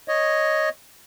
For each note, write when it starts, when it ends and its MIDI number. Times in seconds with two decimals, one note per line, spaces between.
0.08 0.69 73
0.08 0.69 75